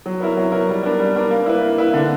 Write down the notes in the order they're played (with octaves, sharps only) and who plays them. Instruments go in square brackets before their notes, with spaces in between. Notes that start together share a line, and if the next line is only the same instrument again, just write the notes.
[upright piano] F#3
B3 E4 A#4
F#3
B3 E4 A#4
G3
B3 D4 A#4
G3
B3 D4 A#4
A#3
E4 B4
A#3
E4 B4
D3